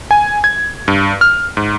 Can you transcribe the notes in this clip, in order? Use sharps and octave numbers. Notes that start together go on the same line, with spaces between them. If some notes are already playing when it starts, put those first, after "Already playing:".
G#5
G#6
G2
F6
G#2